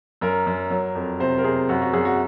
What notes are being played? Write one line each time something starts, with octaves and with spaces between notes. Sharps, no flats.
F#2 A#4
F#2
F#3
F2
C3 C5
A#4
C3 G#4
F#2 F#4
F#4
F#2 G#4
F#4